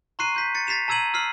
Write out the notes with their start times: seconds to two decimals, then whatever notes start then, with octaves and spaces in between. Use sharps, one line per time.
0.19 A#5 C6 C#6 F#6 C7 D#7
0.34 C6 G6 B6
0.55 A6 C#7
0.67 A6 B6 C7 E7 F7
0.88 A5 A#5 E6 G#6 D#7 F#7
1.14 E6 F6 C7 F#7